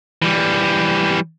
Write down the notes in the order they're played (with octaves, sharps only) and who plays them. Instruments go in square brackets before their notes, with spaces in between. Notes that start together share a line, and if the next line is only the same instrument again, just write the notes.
[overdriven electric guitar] E3 G3